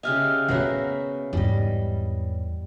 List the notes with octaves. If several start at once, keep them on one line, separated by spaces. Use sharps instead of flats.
C#3 G4 D#5 E5 G#5 F6
C#3 B3 F#4 A#4 B4 C#5 E5 F#5
E2 G#2 G3 D#5